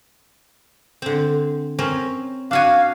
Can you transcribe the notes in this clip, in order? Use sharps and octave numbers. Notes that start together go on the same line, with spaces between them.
D3 C4
C4 C#4 A#4
D4 F#4 F5 G#5